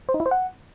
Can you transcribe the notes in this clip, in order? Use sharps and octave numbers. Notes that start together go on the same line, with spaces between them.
C5
D#4
E4
C5
F#5